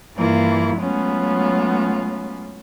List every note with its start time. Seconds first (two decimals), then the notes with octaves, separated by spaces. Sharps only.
0.18 G2 E3 A#3 E4 F4
0.78 F#3 G#3 A3 B3 C#4 F4